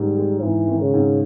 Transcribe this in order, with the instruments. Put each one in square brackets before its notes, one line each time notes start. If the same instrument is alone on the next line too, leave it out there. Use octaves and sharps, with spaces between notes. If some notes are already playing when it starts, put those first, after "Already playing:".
Already playing: [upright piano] G#2 D#3 [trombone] G3
[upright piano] G#3
[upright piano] G#2 [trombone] E3
[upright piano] D#3
[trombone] C#3
[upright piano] G#2